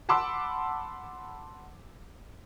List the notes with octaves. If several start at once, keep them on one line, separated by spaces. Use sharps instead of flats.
F#5 A5 B5 C6 D6 E6